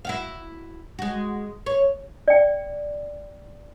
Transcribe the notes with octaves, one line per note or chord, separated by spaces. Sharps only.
E4 F#4 F5
G#3 F#4
C#5
D5 G5